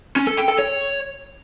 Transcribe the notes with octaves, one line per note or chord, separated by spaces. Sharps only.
C#4
A4
G5
A4
C#5